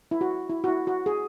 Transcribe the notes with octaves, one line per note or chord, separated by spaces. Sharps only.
E4
F#4
E4
F#4
E4
F#4
G#4